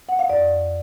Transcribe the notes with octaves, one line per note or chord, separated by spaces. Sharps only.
F#5
F5
F2 D5